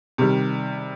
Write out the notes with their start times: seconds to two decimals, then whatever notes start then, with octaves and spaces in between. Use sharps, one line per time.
0.18 C3 D#3 G3